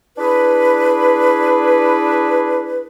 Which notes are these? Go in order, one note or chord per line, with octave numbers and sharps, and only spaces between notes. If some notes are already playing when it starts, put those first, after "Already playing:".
D4 E4 G#4 B4